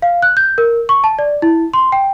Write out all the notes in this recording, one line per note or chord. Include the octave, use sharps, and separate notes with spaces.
F5
F#6
G6
A#4
C#6
A5
D5
E4
C6
G5